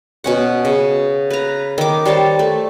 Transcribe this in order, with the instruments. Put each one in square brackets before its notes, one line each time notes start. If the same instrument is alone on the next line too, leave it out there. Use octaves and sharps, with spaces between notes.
[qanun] B2 C#4 F#5
C#3
B4 A#5
D#3 D6
G3 C5 C#5 A5
A3